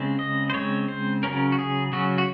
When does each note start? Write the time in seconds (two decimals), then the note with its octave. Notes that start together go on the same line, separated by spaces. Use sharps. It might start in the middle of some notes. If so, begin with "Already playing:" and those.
Already playing: C#3 G#3 C4
0.19 D#5
0.50 C5
0.54 C#3 G#3 C4 C#5
0.88 C5
1.23 C#3 F#3 C#4 A#4
1.52 F#4
1.59 G#4
1.92 C#3 F#3 C#4 F#4
2.18 F#4